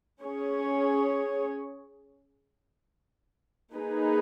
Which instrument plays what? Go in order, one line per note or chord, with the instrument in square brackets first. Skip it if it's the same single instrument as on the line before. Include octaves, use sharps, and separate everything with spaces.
[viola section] C#4 G#4 C#5
A#3 D#4 G#4 B4